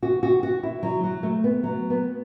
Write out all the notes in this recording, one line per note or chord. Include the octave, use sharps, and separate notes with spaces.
F#4
F#4
F#4
E4
F#3
F#3
A3
B3
F#3
B3